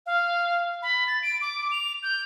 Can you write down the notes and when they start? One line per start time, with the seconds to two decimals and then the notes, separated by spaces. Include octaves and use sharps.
0.06 F5
0.82 B5
1.07 A6
1.23 D7
1.41 D6
1.71 F7
2.03 G6